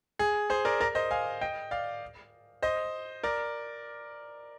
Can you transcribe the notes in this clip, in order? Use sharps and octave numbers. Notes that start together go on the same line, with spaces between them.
G#4
G#4 C5
A#4 D5
A#4 D5
C5 D#5
F5 G#5
D#5 G5
D5 F5
C5 D#5
A#4 D5